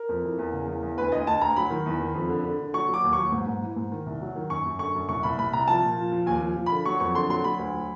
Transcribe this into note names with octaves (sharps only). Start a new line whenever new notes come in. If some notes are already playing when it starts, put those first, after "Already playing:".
Already playing: A#4
F2
E3
E2
C#3
E2
E2
D2 B4
D2 D#5
D2 A5
D2 A#5
F#3 B5
D#3
E2
D#3
F2
D3
D3
D3
F#3 C#6
F#3
D6
D#2
C#6
F#3
G#2
G#2
E3
G#2
D#3
C2
F#3
D#3
F#2 C#6
F#2
D3 C#6
F#2
C2 C#6
C2 B5
C2 B5
C2 A#5
F3 A5
A#2
F3
F3
D#2 G#5
F3
F3
B5
D3
F#3 C#6
F2 C#6
D3 C6
F#3 C6
F#3 B5
D2
F#3